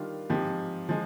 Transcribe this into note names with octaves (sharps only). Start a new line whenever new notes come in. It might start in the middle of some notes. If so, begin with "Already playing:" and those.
Already playing: D#3 G3 D4 F4
G#2 F3 C4 G4
F3 G#3